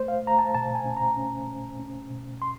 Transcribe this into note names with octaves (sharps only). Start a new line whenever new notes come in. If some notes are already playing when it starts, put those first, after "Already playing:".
Already playing: A3 C5
F5
A3 A#5
A5
B2 A5
G#5
C#4
A#5
C#4
C#4
C#4
B2
C6